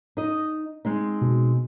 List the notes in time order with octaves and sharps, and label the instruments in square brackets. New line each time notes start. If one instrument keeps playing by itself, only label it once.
[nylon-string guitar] D#4 D#5
G#3 C4 D#4
[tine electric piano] B2